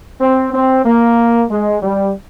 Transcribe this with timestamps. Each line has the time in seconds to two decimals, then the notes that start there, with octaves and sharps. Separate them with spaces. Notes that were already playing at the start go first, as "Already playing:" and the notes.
0.21 C4
0.53 C4
0.85 A#3
1.50 G#3
1.82 G3